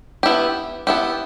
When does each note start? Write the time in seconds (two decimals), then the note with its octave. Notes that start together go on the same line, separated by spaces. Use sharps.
0.23 B3 E4 G4
0.87 B3 E4 G4